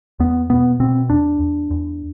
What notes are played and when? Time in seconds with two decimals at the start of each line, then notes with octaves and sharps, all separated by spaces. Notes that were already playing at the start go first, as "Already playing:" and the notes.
0.20 E2 B3
0.50 B2 B3
0.80 B2 C4
1.10 E2 D4
1.40 E2
1.71 E2